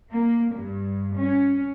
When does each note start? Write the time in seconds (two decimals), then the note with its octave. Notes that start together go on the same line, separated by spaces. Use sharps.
0.11 A#3
0.54 G2
1.18 C#4